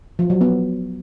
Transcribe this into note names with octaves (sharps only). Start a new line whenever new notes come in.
F3
F#3
B3